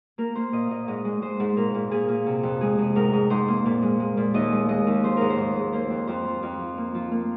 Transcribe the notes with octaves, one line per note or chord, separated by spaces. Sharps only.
A#3 A#4
A#3 C5
A#2 D#5
A#2 D#5
G#2 D#5
G#3
G#3 C5
G#2
A#2 A#4
A#2
A#2 G#4
A#2
C3
F2
G#3 G#4
C3
G#2 A#4
G#2
G#2 C5
A#3
A#2
G#3
G#3
A#2
D#2 D#5
G#3
G#3 D#5
D#2
F3 C5
G#2 A#4
C5
G#2
G#2
A#3 C5
F2
F2 C5
F3
F2
F3
A#3
F3
A#3